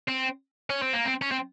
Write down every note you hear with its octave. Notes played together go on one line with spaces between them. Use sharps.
C4
C#4
C4
A#3
C4
C#4
C4